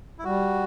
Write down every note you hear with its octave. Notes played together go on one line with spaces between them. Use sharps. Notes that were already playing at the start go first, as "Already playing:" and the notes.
E4
G3 F#4